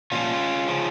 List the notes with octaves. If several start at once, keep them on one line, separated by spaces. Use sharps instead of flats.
A#2 F3 C#4 F4
C#3 F3